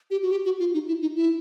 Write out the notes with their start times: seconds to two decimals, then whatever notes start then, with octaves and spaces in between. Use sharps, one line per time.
0.11 G4
0.23 F#4
0.31 G4
0.45 F#4
0.60 F4
0.74 D#4
0.88 E4
1.02 D#4
1.16 E4